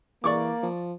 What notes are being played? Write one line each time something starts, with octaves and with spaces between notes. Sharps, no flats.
E3 A#3 D5 C#6 D6
F3